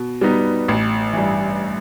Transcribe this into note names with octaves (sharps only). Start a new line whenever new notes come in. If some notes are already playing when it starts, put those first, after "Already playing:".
Already playing: B2
G3 B3 D#4
A1
G2 E3